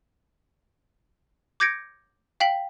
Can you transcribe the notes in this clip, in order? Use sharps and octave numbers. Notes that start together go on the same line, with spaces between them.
D6 G6 G#6 A#6 C#7 D7
F5 G5 B6 F#7